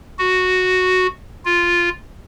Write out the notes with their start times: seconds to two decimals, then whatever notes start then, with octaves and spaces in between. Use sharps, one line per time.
0.19 F#4
1.45 F4